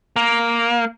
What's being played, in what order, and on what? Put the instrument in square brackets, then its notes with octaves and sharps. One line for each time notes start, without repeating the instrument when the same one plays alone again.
[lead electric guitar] A#3